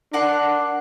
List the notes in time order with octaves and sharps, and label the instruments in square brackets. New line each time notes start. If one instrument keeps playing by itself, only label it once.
[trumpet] D4 [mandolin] A#4 F#5 C6